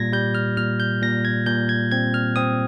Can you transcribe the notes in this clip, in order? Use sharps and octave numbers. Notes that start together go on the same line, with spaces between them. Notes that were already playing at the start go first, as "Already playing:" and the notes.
Already playing: A#2 G3 G#6 A#6
G3 G6
F6
A#2 F6
G6
A#2 A#6
G#6
A#2 G6
G#6
C4 G#6
F6
C4 D#6